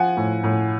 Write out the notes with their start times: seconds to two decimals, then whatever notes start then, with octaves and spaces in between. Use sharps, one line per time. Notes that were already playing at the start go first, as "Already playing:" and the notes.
Already playing: F3 F#5 G#5
0.17 A2
0.44 A2